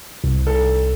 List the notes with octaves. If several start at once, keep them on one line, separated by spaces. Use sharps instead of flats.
C2
A4